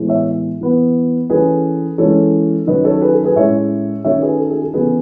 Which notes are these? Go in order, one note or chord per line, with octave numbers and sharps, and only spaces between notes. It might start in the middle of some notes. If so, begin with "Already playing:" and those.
Already playing: A2 E3 G#3 B3
C#5 E5
E3 B3
E3 A3 C#4 G#4 B4
E3 G#3 C#4 A4 C#5
D#3 F#3 C#4 B4 D#5
A4 C#5
G#4 B4
A4
G#4 B4
A2 G#3 C#4 C#5 E5
D#3 A3 C#4 C#5 E5
G#4 B4
A4
G#4
A4
C#3 E3 B3 G#4 B4